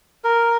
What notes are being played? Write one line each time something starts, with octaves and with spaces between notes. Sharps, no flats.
A#4